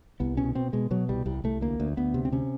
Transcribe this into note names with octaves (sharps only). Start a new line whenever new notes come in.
C2 B3
B2 C#4
B2 C4
B2 G#3
B2 F#3
C2 G3
C2 G3
C2 A3
D2 A#3
D2
D2 B3
C3
C4
C3 C#4